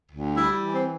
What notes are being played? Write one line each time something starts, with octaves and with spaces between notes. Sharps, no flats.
D2
G3 E4
E3
C4